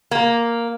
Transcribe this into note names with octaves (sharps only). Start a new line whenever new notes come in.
A#3